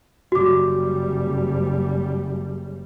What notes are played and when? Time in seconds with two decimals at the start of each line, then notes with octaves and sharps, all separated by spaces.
0.32 F#1 G3 F#4 D6